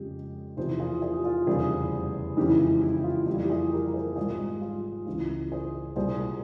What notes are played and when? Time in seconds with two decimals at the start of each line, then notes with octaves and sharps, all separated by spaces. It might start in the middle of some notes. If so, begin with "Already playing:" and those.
Already playing: F2 C#3 F3 G#3 G4
0.57 E2 C3 F3 G#4 C5
0.80 F4 G#4
1.02 F4 G#4
1.15 G4
1.24 F4 G#4
1.46 F1 E2 C#3 G3 G#4 C5
2.37 F2 C#3 E3 G#3 E4 G4
2.59 F4
2.82 E4
3.04 F4
3.26 F2 E3 G3 E4 G4
3.42 G4
3.49 F4 G#4
3.71 G4 A#4
3.88 A#4
3.94 G#4 C5
4.16 G#1 G#2 G3 F4 G#4
4.61 F4
5.06 C#2 C#3 E3 G#3 F4
5.52 G#4 C5
5.96 C2 A#2 G3 G#4 C5